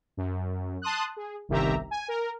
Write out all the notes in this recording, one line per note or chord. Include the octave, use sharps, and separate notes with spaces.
F#2
A5 C6 D#6 F#6
G#4
G1 C2 D#3 G4 E5 A#5
G#5
A#4